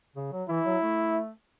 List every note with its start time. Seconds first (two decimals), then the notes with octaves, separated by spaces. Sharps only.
0.16 C#3
0.32 F#3
0.49 E3 E4
0.66 F#3
0.83 A3